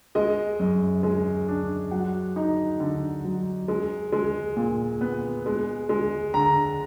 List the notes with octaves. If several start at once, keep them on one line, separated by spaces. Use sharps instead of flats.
G#3 D#5
F#2
G#3
D4
F#3 F#5
D#4 A#5
D3
F#3
G#3
G#3
A#2
B3
G#3
G#3
D3 A#5